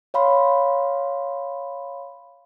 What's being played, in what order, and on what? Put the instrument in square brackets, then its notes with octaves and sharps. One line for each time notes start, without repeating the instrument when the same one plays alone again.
[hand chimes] C#5 F5 B5 C6